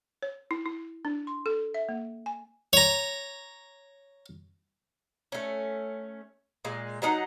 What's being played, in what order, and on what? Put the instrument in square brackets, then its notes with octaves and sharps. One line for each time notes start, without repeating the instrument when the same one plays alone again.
[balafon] C#5
E4
E4
D4
C6
A4
E5
A#3
G#5
[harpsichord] C#5 A#5
[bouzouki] A3 C#4
A#2 G#3
F#3 D4 D#4 F#5